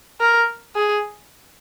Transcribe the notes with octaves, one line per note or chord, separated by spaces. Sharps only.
A#4
G#4